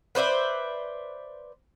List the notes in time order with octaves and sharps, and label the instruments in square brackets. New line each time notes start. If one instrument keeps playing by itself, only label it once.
[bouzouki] B4 C5 D5 E5